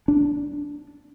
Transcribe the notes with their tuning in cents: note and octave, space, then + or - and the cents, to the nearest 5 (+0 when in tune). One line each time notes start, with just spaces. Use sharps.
D4 -10